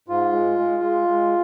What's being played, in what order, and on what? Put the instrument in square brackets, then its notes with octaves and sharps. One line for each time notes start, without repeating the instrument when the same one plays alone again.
[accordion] G#2 F4
G#3
G#3
G#3
G#3